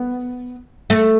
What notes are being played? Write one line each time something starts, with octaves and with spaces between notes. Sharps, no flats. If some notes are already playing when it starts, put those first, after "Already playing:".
Already playing: B3
A3